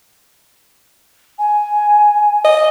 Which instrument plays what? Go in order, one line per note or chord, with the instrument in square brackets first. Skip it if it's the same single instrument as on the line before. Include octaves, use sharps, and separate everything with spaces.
[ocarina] G#5
[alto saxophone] D#5